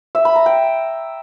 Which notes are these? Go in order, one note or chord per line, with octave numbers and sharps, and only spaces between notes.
E5
B5
A#5
G5